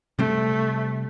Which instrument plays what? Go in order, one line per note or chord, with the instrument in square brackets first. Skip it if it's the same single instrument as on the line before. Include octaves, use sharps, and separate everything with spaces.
[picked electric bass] C3 G3 C4 [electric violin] A3